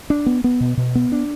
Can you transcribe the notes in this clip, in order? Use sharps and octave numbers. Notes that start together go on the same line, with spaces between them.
D4
B3
B3
B2
B2
B3
D4